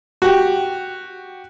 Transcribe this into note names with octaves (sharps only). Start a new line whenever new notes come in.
F#4 G4